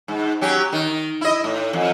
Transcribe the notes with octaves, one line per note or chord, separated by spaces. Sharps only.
G#2
F#3 C#4 G4
D#3
E4 D#5
A2
F2